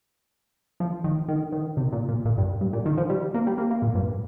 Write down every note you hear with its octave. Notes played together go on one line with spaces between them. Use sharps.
F3
D#3
D#3
D#3
C3
A#2
A#2
A#2
G2
G2
A#2
D#3
F3
G3
A#3
G3
A#3
A#3
A#2
G2